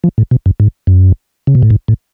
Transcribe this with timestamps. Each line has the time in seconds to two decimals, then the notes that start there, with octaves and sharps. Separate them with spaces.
0.04 F3
0.18 A2
0.31 B2
0.46 F#2
0.60 G#2
0.87 F#2
1.47 C#3
1.55 B2
1.62 A2
1.70 G#2
1.88 A2